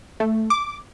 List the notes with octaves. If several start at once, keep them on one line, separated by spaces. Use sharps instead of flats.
A3
D6